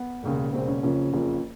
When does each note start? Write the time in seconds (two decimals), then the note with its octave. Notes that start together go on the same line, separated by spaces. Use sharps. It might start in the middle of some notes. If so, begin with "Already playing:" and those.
Already playing: B3
0.23 E1 D#2 C#3
0.53 E1 D#2 C#3 C4
0.68 C#4
0.83 F#1 F2 C#3 F3 C#4
1.13 F#1 F2 C#3 F3